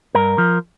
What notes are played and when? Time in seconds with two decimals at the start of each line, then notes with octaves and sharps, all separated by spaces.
0.15 G2 A#4
0.38 F3